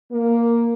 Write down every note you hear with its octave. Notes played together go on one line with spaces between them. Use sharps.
A#3